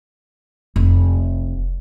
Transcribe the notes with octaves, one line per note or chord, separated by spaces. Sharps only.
F1